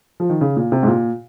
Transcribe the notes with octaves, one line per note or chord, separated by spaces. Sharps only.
F3
D#3
C#3
A#2
C3
G#2
A#2